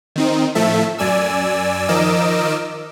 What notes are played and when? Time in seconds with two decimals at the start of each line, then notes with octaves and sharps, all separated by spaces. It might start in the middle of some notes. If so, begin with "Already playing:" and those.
0.16 D#3 C4 D#4
0.55 A2 F3 A3 A4 E5
0.98 F#2 D5 G#5 E6
1.88 D#3 F3 A#4 D#5 D6 E6